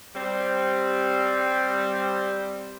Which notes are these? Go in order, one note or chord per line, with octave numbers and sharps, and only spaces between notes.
G3 C4